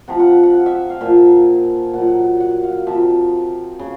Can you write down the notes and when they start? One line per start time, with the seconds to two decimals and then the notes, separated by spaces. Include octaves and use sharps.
0.08 C3 F3 F#5
0.20 F#5
0.32 F#5
0.43 F#5
0.54 F5
0.66 E5
0.90 F5
1.01 A#2 F3 E5
1.94 A#2 F#3 F#5
2.40 F#5
2.64 F5
2.87 C3 F3 E5
3.79 C#3